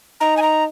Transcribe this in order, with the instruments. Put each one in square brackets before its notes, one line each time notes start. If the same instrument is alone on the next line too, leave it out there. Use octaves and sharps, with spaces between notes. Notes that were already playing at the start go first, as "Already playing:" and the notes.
[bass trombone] D#4 [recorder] A#5
[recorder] G#5
A#5